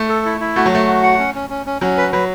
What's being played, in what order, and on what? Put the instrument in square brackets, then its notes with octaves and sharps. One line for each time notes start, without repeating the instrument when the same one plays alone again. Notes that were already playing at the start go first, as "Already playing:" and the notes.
Already playing: [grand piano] A3
[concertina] A4
E4
E4
[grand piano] A3 [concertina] F#4
[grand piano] F#3
[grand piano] A3 [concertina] F#4
[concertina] F#4
F#5
C#4
C#4
C#4
C#4
[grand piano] F#3 [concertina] C#4
[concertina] B4
[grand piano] F#3 [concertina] B4